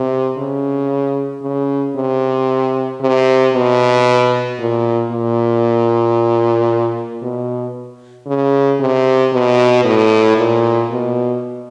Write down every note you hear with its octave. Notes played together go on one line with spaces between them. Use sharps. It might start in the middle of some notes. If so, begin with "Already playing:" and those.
Already playing: C3
C#3
C#3
C3
C3
B2
A#2
A#2
B2
C#3
C3
B2
A2
A#2
B2